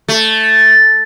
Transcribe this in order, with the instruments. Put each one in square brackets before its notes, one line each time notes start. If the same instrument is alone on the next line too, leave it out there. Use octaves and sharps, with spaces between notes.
[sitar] A3